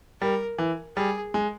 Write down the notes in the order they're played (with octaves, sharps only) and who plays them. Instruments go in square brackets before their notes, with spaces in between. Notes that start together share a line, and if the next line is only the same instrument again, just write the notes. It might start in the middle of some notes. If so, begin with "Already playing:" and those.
[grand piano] G3 [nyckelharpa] A#4
[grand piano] E3
[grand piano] G3 [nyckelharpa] G#4
[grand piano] G#3